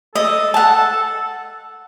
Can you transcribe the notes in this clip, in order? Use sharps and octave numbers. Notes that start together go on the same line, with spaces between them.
A4 D#5
F#5 A5